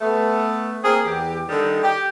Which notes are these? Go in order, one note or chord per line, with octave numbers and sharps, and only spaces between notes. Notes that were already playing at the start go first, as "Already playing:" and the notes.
A3 B3
A#3 C4 G#4
E2 G4
D3 D#3 G3 D#4
G4